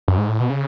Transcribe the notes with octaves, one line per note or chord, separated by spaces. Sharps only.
F#2
G#2
A2
B2
C#3